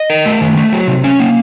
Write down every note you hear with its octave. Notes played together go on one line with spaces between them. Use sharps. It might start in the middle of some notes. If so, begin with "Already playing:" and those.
Already playing: D#5
A#4
A3
D#3
A3
F#3
C3
C#4
A#3